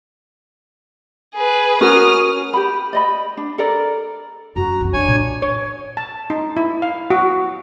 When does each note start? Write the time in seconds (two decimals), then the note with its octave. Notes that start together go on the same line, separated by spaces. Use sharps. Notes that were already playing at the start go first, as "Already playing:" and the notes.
1.35 G#4 B4
1.81 C#4 F#4 A#4 D#6 F6
2.53 G4 G#5 B5
2.93 D5 D#5 B5
3.37 D4
3.58 A4 A#4 D5
4.56 F#2 F#4 A#5
4.81 E3 C4
4.93 G#3 D4 C#5 G#5
5.07 A#2
5.42 C#5
5.97 A5
6.30 D#4
6.57 E4
6.82 F5
7.10 F#4